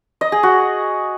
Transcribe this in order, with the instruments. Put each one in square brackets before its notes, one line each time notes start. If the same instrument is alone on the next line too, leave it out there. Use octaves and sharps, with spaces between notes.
[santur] D#5
G#4
F#4